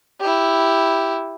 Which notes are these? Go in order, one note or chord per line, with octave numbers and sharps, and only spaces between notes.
E4 G4